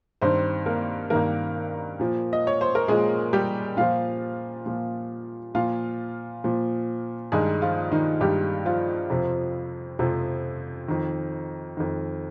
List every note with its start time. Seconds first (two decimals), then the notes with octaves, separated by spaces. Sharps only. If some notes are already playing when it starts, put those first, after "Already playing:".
0.21 G2 D#3 C4 C5
0.66 A#3 A#4
1.10 G2 D#3 A#3 A#4
2.00 A#2 F3
2.33 D#5
2.47 C#5
2.61 C5
2.75 A#4
2.88 A#2 F3 G#3 G#4
3.33 G3 G4
3.77 A#2 F3 F4 F5
4.66 A#2 F3
5.55 A#2 F3 F4 F5
6.44 A#2 F3
7.32 G2 D#3 G#3 G#4
7.62 F3 F4
7.92 D#3 D#4
8.21 G2 D#3 G3 G4
8.65 F3 F4
9.10 F2 C3 F3
9.99 F2 C3 F3
10.88 F2 D#3
11.77 F2 D#3